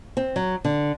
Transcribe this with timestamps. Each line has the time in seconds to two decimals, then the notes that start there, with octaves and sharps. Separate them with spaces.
0.17 C4
0.36 F#3
0.65 D3